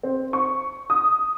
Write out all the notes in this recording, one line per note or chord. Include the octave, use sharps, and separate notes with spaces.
C4
C#6
D#6